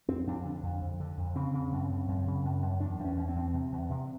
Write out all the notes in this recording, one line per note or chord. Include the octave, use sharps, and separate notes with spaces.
F2 C4
F2 D4
D3
F2
F2
D3
F2
C#3 C4
C#3
F#2
C#3
F#2
C#3
F#2
F#2
E2 D4
E2
C#4
E2
C4
E2
C3
E2
C3